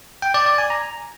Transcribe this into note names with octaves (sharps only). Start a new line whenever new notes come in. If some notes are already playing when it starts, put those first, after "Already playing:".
G5
D5
D5
G#5
A#5